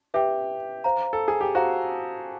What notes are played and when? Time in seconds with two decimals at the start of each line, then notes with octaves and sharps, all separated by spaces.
0.14 G4 B4 E5 G5
0.84 C5 F5 A#5
1.13 A4
1.28 G#4
1.41 G4
1.55 F#4 C5 F5 A#5